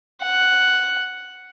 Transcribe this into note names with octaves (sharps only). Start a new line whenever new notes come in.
F#5